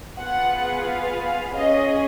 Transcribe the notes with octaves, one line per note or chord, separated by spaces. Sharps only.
B3 F4 G#4 F#5
F5
F5
C#4 G#4 D#5